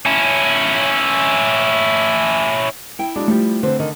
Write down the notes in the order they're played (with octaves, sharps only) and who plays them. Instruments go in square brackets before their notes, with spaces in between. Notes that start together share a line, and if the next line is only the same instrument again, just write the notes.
[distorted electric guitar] C#4 E4
[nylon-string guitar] E4 G5
[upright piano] F#3 G#3 D4
[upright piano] F3 G3 G4 [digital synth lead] A3
[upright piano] D3 C4 [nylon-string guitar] B4 C5
[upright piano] D3 [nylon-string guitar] D#3